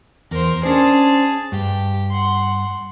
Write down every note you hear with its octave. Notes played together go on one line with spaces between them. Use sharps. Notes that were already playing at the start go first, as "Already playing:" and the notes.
E2 A#4 C5
C#4 D4 G#4 C5 A5
G2 G4
F#5 C6